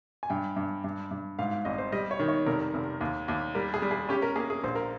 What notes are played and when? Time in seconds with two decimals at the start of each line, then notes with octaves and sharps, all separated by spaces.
0.23 G#5
0.30 G2 G5
0.57 G2
0.84 G2
1.11 G2
1.39 G#2 F5
1.51 F5
1.65 G#1 D#5
1.78 C5
1.92 G3 D#5
2.11 C#5
2.19 D#3
2.29 C#5
2.46 F1 A#4
2.74 F1
3.01 D#2
3.28 D#2
3.55 G3 A#4
3.74 G#4
3.82 G3
3.91 G#4
4.09 C#4 G4
4.22 A#4
4.36 A#3 G#4
4.50 G#4
4.64 A#1 C5
4.75 A#4